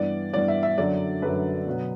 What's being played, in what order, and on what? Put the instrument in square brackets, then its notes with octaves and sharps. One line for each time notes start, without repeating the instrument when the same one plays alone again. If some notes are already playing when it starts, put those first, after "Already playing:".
Already playing: [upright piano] G2 E3 B3 D5
G2 E3 B3 D5
E5
E5
F#2 D3 F#3 D5
F#2 D3 F#3 B4
B2 F#3 B3